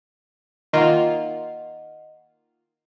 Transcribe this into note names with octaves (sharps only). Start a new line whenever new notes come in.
D#3 A#3 F4 D#5 F#5